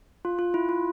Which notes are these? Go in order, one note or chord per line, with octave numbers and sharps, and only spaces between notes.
F4
F4
E4
F4